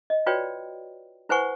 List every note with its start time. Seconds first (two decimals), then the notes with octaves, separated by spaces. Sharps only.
0.10 D#5
0.26 F4 F#4 B4 C#5 D5 G5
1.29 E4 B4 C5 F#5 G#5 C#6